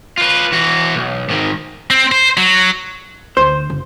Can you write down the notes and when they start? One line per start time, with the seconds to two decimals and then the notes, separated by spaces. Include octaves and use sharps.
0.17 F4 B4
0.52 E3 F#4
0.94 B1
1.29 G#2 D#3
1.90 C4
2.12 C5
2.37 F#3
3.37 D2 C5
3.70 F#1